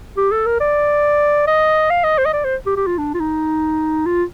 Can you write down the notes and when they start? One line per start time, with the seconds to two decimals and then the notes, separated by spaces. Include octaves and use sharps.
0.17 G4
0.32 A4
0.46 A#4
0.60 D5
1.47 D#5
1.90 F5
2.04 D#5
2.18 C5
2.26 D#5
2.33 D5
2.45 C5
2.66 G4
2.77 G4
2.87 F4
2.98 D4
3.14 F4
3.20 D#4
4.06 F4